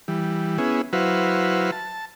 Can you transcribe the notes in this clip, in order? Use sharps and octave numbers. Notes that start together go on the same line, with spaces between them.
E3 G3
B3 C#4 E4 G#4
F#3 E4 F#4 B4 C5 F5
A5